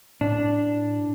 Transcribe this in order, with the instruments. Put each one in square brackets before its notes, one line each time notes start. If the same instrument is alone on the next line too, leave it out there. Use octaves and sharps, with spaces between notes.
[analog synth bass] A2 [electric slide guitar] D4